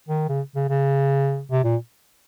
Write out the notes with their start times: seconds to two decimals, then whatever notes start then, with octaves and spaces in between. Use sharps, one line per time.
0.09 D#3
0.29 C#3
0.56 C#3
0.69 C#3
1.51 C3
1.64 A#2